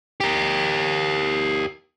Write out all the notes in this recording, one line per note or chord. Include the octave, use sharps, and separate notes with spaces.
G4 A#4